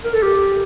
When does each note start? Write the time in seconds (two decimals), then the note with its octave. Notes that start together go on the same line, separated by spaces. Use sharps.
0.04 A#4
0.13 A4
0.23 G4